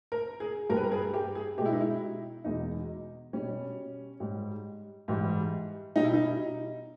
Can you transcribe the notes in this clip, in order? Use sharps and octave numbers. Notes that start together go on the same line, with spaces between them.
A#4
G#4
G2 G3 A#4 B4
A#4
G#4
G4
G#4
B2 G#3 E4 G4
D#4
E4
E2 B2 G#3 D#4
B2 G3 C#4
G#2 G3
G#2 E3 G3
B2 G3 D#4
E4
D#4